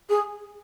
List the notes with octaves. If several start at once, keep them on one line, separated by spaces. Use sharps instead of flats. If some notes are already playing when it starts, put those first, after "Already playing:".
G#4